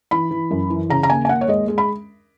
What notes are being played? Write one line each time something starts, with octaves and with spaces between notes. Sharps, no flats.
E3 B5
E3
F#2
E3
C#3 A#5
A#5
D#2 G#5
G#5
D#2 F#5
C#5
G#3 D#5
G#3
B5